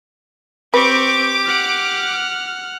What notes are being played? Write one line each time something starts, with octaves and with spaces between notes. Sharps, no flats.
C4 G4 B4 C#6 D6
F#5 F6